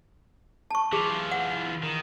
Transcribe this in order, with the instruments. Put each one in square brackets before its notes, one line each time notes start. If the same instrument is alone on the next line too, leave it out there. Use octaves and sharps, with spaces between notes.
[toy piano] A5 C#6
[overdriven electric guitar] E3 F4 [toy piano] G#4
[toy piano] F#5
[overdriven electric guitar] D#3